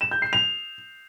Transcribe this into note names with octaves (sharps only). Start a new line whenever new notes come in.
E7
G6
C7
F7